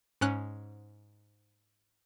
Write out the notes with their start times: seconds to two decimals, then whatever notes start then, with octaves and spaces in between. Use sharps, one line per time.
0.21 G#2 C#4 F#6